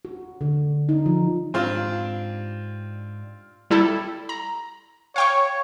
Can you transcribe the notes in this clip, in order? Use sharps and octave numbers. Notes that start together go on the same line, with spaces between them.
F#4
D3
D#4
F3
G#2 C4 D4 F4 G4
G3 E4 A4
A#5
C#5 F5 G5 C#6